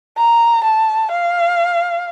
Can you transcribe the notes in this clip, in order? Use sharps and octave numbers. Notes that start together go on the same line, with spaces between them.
A#5
A5
F5